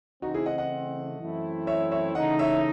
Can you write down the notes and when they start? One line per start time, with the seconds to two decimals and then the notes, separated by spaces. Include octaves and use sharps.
0.22 C#3 E3 A3 C4 D#4 F#4
0.34 E4 G#4
0.46 D#5 F#5
0.58 D#5 F#5
1.19 F#2 E3 A3 C4 E4
1.67 C#5 E5
1.91 C#5 E5
2.15 C#3 E3 A3 D#4 D#5 F#5
2.39 C#5 E5